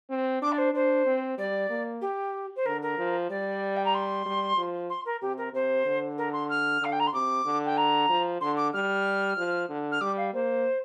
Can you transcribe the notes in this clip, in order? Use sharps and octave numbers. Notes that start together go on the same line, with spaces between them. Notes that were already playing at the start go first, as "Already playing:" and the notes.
C4
D4 D6
D5
C5
D4 C5
C4
G3 D5
A#3
G4
C5
D3 A#4
A#4
F3
G3 D5
G5
A#5
C6
G3
F3
C6
A#4
C3 G4
A#4
C3 C5
D3
A#4
C6
F6
D3 F5
G5
A#5
C6
C3 D6
D3
G5
A#5
F3
D3 C6
D6
G3 F6
F3
D3
F6
G3 D6
F5
A#3 C5